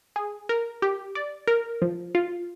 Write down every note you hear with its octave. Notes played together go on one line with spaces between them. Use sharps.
G#4
A#4
G4
D5
A#4
F3
F4